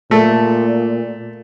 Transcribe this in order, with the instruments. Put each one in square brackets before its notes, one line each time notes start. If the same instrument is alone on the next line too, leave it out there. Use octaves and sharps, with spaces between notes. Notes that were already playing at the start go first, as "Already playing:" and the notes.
[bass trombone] A#2 [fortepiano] A3